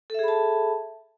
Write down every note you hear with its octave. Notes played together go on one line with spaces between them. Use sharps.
G#4 A4 E5 A5 B5